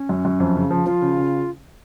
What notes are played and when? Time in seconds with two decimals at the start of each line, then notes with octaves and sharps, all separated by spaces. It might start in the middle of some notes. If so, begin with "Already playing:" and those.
Already playing: C#4
0.09 F#2
0.25 F#2
0.40 F2
0.56 C#3
0.71 F3
0.86 F3 F4
1.02 C#3
1.17 C#3